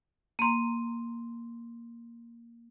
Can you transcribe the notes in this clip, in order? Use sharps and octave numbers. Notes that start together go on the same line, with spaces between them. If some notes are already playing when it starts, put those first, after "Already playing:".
A#3 A#5 C6 D#7